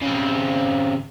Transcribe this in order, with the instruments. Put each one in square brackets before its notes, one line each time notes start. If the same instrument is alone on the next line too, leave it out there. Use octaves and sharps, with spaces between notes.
[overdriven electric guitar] C#3 C4